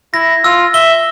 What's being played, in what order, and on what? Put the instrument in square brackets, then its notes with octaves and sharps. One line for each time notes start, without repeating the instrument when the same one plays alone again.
[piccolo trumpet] E4 [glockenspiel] A#6
[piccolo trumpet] F4 [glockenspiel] E6
[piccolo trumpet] E5 [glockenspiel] G7